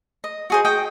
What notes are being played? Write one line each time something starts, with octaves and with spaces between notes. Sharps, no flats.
D#5
F#4 G#4 C5
F#4 D#5 G5